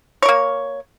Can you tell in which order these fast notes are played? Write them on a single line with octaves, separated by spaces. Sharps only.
C#5 A#4 A#3